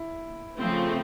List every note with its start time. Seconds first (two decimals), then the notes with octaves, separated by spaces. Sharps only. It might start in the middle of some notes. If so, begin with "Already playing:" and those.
Already playing: E4
0.58 C#3 F3 A3 C4